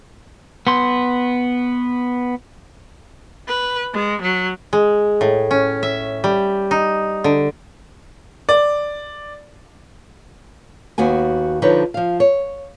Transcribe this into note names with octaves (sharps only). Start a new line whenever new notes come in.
B3 C6
B4
G#3
F#3
G#3
A2
C#4
E5
G3
D#4
D3
D5
D#2 B3 F#4 G#5
D3 F3 D#4 B4 C#5
F3 F5
C#5